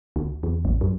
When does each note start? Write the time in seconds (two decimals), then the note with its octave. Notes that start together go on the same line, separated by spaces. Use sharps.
0.16 D2
0.43 E2
0.65 A1
0.81 F#2